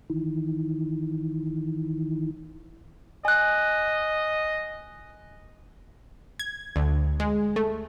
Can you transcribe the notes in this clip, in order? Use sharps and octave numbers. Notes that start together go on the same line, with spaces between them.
D#3 E3
D#5 G#5 F#6
G#6
D2
G#3
A3